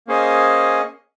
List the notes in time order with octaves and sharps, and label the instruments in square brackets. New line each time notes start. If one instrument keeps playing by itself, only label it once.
[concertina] A#3 C#4 G#4 C5 D#5